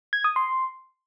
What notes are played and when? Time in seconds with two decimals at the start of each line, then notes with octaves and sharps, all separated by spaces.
0.13 G#6
0.24 D#6
0.36 C6